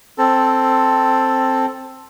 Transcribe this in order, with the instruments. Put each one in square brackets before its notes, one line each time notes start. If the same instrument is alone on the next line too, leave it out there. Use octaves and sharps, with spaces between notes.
[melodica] C4 A4